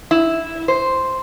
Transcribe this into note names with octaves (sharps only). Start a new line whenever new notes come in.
E4
C5